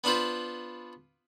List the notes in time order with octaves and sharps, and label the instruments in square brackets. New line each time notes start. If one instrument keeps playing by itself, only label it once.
[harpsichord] B3 D4 F4 B4 C5